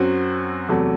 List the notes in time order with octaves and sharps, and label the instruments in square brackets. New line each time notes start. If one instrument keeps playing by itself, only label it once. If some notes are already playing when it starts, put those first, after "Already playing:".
Already playing: [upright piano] F#2 F#3 C4 F#4 C5
E2 C3 F#3 A3